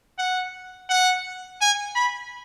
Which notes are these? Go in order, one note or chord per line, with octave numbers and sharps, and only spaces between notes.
F#5
F#5
G#5
B5